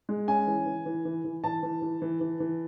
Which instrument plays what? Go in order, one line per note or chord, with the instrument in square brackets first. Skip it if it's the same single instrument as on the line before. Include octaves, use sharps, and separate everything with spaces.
[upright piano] G#3
C#4 G#5
E3
E3
E3
E3
E3
E3 A5
E3
E3
E3
E3
E3